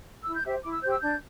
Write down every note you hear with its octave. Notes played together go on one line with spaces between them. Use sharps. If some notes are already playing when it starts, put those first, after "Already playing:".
E4 E6
G6
G4 C5 E5
E4 D6
E6
G4 C5 G6
E6
D4 G6